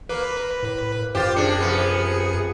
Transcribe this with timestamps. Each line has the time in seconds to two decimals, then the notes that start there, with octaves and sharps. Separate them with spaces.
0.09 A#3 B4
0.62 A2
1.15 F#2 F4 G4 C5 A6
1.36 C3 D4 G#4 C#7
1.60 C3 F3 B3